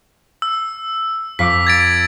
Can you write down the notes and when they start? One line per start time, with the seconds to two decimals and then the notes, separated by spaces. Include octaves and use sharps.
0.42 E6
1.39 F2 F5 D6 B6
1.67 G#6 A6 D7